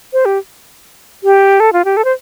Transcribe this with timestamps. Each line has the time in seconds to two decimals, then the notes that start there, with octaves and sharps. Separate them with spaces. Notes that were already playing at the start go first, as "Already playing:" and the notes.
0.13 C5
0.25 G4
1.24 G4
1.60 A4
1.73 F4
1.85 G4
1.97 A4
2.05 C5